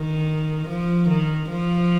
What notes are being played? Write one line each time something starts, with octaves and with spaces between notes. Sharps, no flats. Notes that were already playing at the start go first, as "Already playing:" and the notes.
Already playing: D#3
F3
D#3
F3